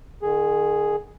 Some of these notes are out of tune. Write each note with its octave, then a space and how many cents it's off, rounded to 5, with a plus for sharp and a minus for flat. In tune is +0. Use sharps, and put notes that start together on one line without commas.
D#3 -40 G#4 +0